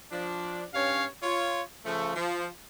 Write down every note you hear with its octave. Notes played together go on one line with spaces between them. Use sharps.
F3 D4
G2 C#4 C#5 F5
F4 C#5
C#3 F3 A3
F3